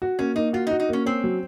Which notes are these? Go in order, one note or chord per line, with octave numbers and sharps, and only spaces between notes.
F#4
A#3 C#4
A#3 D#4
F4 F#4
D#4
F#4
D#4
A#3 C#4
C4 C#4
F#3